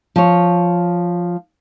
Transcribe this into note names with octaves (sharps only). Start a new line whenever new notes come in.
F3 C#5